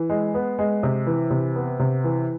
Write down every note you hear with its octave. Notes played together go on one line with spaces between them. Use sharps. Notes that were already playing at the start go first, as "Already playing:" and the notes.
Already playing: E3
G#3
B3
G#3
C3
E3
C3
B3
C3
E3